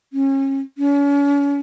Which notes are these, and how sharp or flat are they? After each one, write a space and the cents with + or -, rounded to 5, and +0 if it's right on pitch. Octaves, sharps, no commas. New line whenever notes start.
C#4 -30
C#4 +40